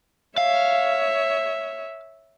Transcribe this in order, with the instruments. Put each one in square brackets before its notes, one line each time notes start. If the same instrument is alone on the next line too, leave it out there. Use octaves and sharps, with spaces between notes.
[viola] C#5 E5 [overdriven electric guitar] F5